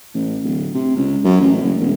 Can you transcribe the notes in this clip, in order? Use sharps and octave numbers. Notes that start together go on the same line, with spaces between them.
A1
D1
C3
C#2
F#2
A1
F#1
E1